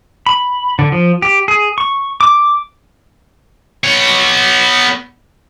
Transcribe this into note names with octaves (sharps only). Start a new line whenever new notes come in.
B5
D3
F3
G4
G#4
C#6
D6
B3 C#5